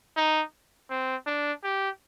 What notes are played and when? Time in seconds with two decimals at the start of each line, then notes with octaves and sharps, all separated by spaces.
0.16 D#4
0.90 C4
1.27 D4
1.64 G4